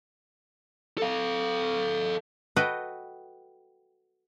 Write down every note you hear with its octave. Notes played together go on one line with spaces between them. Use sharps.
A4 F5
F#4 A4 B4 D#5 G5